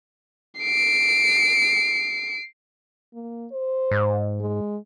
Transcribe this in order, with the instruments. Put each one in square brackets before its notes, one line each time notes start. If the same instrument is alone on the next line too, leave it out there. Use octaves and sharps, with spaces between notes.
[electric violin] C7 D7
[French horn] A#3
C5
[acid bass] G#2
[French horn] G#3